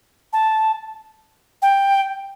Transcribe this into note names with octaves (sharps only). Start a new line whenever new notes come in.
A5
G5